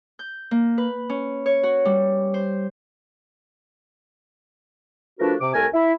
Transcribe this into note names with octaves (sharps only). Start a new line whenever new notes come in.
G6
A#3
B4
C#4
C#5
F#4
G3
C5
F3 A3 D4 F#4 A#4 B4
C3 D6
C2 A3 A#4 G#5
E4